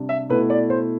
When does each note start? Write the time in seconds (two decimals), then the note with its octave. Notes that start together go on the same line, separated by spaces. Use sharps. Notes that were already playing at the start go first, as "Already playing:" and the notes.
Already playing: C3 G3 D4
0.09 E5
0.29 B2 A3 E4 B4
0.50 D5
0.70 C5